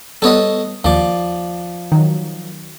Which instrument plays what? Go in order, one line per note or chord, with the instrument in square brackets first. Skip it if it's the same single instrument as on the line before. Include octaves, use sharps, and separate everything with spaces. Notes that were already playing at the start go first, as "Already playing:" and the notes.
[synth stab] G3 B3 [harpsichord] A4 C#5 D#5
[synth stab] D#2 [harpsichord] F3 D5
[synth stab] D#3 F#3